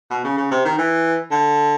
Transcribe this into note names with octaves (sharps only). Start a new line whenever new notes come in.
B2
C#3
C#3
C3
D#3
E3
D3